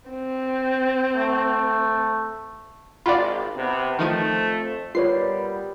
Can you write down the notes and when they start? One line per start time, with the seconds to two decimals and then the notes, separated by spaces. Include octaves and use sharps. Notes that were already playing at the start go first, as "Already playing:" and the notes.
0.10 C4
1.15 A3
3.06 G#1 F4 F#4 D5 F5 B5
3.56 C3 B3
3.99 F2 D#3 F3 A3 D#7
4.95 A#2 G3 B3 F4 B4 C#5 C7